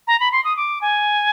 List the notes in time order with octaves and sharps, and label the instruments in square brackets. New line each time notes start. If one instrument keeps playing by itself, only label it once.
[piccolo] A#5
B5
C6
D#6
D6
G#5